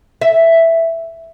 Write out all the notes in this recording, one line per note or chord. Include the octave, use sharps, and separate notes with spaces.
E5